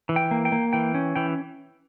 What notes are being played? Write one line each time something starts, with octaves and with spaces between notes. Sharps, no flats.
E3
G5
A#3
G5
A#3
E3 G5
C#4
E3 G5